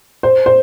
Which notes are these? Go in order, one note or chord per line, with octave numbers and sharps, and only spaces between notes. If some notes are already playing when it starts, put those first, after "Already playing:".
C5
C5